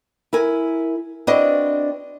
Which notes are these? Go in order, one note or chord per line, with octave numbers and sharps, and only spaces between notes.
E4 A#4 G#5
C4 D4 E4 F#4 B4 D#5